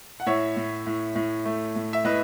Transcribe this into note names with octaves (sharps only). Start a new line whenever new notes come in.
F#5
A2 C#5 E5
A2
A2
A2
A3
A2
E5
A2 B4 D#5